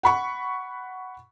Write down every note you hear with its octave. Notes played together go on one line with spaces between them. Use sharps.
F#5 B5 C#6